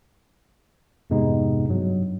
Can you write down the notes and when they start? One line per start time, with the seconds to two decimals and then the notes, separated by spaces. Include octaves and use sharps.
1.10 F2 G#2 C3 G#3 B3 D#4
1.66 G2 F#3